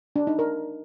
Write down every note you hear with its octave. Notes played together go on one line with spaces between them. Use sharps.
D4
D#4
A#4